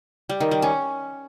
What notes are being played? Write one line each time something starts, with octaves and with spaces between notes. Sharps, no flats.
G3
D#3
G3
C#4